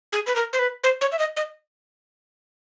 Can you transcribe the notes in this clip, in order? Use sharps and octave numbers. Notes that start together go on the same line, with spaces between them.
G#4
B4
A#4
C5
B4
C5
C#5
E5
D#5
D#5